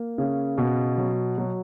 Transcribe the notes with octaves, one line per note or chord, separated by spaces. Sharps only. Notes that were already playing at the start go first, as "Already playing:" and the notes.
Already playing: A#3
C#3
B2
F#3
F#3